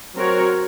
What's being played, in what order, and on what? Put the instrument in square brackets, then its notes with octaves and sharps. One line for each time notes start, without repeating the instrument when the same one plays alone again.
[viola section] F#3 C4 F#4 A#4 C#5